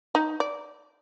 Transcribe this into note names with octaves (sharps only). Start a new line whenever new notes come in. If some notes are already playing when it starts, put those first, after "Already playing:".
D#4
D5